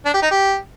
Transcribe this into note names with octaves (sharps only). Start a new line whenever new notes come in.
D4
G4
D#4
G4